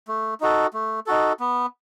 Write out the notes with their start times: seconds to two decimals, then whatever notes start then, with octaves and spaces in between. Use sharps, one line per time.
0.08 A3
0.41 D#4 F#4 A4
0.74 A3
1.07 D#4 F#4 A4
1.40 B3